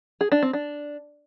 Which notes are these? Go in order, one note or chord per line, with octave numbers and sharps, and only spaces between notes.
G#4
D4
C4
D4